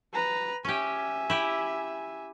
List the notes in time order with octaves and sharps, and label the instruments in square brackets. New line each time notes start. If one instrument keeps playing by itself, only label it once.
[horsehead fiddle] B4 A#5
[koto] C#4 G4 [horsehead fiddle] E5 G#5
[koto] E4 G4